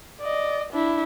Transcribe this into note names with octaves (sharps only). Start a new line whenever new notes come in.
D5 D#5
D4 E4